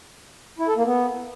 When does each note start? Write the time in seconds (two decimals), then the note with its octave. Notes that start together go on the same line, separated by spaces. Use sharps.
0.59 E4
0.68 A4
0.77 A#3
0.86 B3